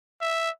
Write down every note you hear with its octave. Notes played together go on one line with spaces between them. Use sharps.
E5